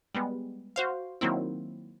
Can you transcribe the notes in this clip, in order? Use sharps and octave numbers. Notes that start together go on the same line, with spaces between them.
G3 G#3 B3
F#4 C5 F5
D#3 F#3 A#3 C4 E4